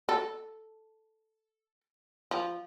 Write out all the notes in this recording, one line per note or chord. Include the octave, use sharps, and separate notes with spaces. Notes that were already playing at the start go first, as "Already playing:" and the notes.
A4
F3